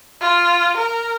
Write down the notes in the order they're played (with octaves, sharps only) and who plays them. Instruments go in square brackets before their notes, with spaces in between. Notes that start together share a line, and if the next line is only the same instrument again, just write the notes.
[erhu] F4
A#4